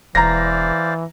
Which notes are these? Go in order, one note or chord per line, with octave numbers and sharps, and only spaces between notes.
E1 E3 C5 D5 F5 A#5 A#6